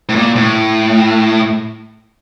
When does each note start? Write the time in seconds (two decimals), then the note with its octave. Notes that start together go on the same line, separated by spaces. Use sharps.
0.09 A2
0.16 A#2
0.36 A2